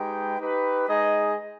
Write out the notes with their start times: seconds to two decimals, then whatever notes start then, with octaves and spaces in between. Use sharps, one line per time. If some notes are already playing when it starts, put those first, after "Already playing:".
Already playing: G#3 D#4 G4 B4 G5
0.39 D#4 G4 B4
0.88 G#3 D#4 G#4 D#5